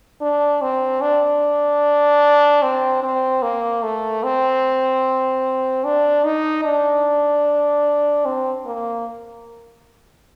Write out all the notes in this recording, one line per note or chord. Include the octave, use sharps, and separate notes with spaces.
D4
C4
D4
C4
C4
A#3
A3
C4
D4
D#4
D4
C4
A#3